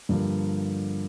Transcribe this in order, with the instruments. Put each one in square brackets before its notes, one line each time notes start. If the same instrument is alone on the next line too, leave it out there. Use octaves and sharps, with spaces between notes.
[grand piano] G2 D3 F3 A#3